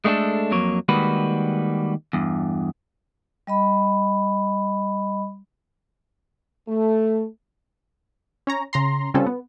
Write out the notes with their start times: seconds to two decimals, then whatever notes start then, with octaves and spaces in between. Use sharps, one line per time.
0.05 G#3 A3 D4 G4 A4
0.51 F2 F#3 A#3 C#5
0.89 D#3 G3 G#3 A#3 F#4 B4
2.13 E2 G2
3.47 G3 D#5 B5
6.69 A3
8.47 C#4 C#5 A#5
8.73 C#3 A#5 C6
9.14 C#3 G3 C4 C#4 F4 A4
9.27 B3